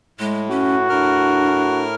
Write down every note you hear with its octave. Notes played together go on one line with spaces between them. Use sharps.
A2 G#3
C#4 F#4
A2 D4 A#4 F6